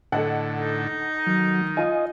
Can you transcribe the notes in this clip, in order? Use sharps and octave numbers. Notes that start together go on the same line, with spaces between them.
A2 D3 A4 D#5 F#5
D#4
D#3 F#3
F4 D#5 G#5